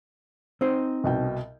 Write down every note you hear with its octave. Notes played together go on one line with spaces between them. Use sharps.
C4 D#4 C5
C2 B2 G5